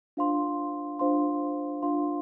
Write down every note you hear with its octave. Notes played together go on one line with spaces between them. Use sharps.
D4 F4 C5 F5 C6
D4 F4 C5 F5 C6
D4 F4 C5 F5 C6